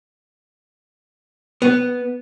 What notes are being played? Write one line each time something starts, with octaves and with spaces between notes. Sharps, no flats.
B3